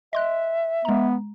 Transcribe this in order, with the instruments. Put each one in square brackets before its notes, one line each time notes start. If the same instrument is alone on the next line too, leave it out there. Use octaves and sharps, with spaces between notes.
[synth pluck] D#5 C6 F#6 [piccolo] E5
[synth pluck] G#3 A#5 [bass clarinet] B3